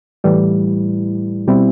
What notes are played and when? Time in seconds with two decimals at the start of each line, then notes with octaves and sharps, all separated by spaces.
0.24 A2 E3 G3
1.47 B2 G3 C4 E4